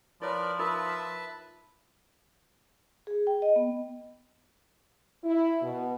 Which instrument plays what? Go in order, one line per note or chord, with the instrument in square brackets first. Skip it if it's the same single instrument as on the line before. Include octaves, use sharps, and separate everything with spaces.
[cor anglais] F3 [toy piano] E4 C#5 [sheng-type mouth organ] A#4 B4 D5
[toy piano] D#4 F4 A#4 [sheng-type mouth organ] B4 E5 A5
[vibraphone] G#4
G5
D#5
B3
[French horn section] E4
B2